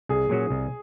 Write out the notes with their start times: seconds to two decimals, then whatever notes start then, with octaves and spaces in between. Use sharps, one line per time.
0.09 C2 G#4
0.29 A#2 F#3 C#4 F#4
0.50 C2